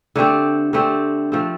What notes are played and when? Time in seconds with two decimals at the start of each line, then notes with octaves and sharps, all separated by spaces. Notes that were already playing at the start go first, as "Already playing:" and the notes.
0.16 D3 A3 C4 G4
0.73 D3 A3 C4 G4
1.32 F3 A3 C4